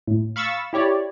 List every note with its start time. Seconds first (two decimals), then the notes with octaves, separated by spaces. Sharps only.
0.07 A2
0.36 F5 B5 C#6 E6 A6
0.73 E4 G4 C#5 D5